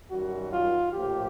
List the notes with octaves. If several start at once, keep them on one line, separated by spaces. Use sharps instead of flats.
F#2 D#3 G3 F#4
F4
A#1 A2 F3 G4